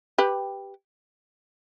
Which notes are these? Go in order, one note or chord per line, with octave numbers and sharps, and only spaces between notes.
G4 B4